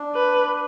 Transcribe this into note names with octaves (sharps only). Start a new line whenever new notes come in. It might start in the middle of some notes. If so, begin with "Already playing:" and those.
Already playing: D4
B4